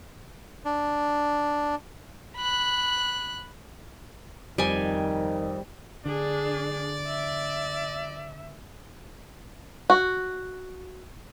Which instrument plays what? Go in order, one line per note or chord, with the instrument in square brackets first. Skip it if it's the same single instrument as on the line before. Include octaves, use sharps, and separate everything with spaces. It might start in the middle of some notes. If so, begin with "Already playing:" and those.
[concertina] D4
[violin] B5 F#6
[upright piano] F2 G4 G7 [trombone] D#3 [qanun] G3 G#5
[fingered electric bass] D3 [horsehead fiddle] D4 G#4 [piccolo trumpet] D5
[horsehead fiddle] E5
[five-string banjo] F#4